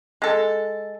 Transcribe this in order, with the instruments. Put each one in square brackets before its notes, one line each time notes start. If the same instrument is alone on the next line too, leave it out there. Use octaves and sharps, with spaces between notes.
[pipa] G#3 A4